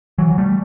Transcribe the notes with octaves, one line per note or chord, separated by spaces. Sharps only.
E3 F#3
G3 A3